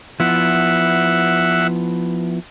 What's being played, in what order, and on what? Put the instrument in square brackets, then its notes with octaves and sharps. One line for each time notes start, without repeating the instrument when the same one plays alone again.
[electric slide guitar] F3 B3 E4 [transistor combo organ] E5 F#5